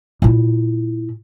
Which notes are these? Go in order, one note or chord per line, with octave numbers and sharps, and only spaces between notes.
A#2 E4